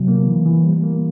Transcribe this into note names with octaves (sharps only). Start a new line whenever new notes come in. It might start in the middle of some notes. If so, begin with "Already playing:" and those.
Already playing: C3 F#3
A#3
E3
E3
G3
A#3